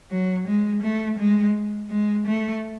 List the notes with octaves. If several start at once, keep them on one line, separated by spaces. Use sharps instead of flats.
F#3
G#3
A3
G#3
G#3
A3